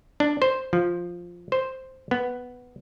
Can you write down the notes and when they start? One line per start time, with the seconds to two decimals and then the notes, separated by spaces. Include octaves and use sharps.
0.20 D4
0.42 C5
0.73 F3
1.52 C5
2.11 B3